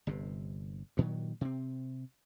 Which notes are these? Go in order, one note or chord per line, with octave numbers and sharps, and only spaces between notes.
G1 G2 C3
G2 A#2 D#3 F#3
C3 C4